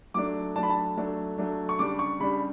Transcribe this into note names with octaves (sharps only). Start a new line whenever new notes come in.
F#3 A3 D4 D6
F#3 A3 D4 A5
B5
A5
F#3 A3 D4
F#3 A3 D4
C#6
C#3 G3 D4 D6
C#6
C#3 G3 D4 B5